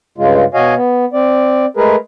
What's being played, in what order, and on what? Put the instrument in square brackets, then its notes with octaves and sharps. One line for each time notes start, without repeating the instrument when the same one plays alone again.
[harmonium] G2 C#3 G#3 F4
B2 F#4 C#5 D#5 F5 G#5
B3
C4 D5
G#3 A3 G#4 A#4 B4